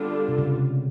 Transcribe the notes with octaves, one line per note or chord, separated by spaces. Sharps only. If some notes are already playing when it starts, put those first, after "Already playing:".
Already playing: D3 G3 B3 D4 F4
C3
C#3
C3